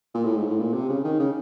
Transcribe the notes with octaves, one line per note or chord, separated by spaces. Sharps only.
A#2
A2
G#2
A2
A#2
C3
C#3
D#3
C#3